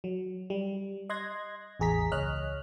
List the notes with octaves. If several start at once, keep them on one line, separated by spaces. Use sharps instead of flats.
F#3
G3
D#5 C6 F#6 G#6 A#6
A1 E2 G#4 A#5 B6
C#2 C#5 D#5 F6 F#6